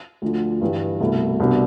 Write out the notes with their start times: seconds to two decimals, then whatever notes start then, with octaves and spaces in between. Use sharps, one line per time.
0.22 D2 D3 F3
0.61 G2 E3 G3
1.00 C2 B2 A3 E4
1.40 C2 B2 B3 D4